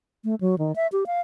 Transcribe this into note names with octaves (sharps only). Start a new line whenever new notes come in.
A3
F#3
D#3
E5
G4
F5